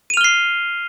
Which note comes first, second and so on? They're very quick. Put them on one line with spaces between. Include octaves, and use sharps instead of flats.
D#7 F7 F6 G7 C7